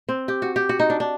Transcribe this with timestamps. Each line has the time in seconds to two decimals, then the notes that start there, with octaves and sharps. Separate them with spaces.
0.09 C4
0.28 G4
0.42 F#4
0.56 G4
0.69 F#4
0.80 D#4
0.90 D4
1.00 D4